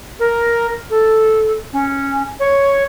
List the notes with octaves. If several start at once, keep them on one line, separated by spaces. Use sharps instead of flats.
A#4
A4
C#4
C#5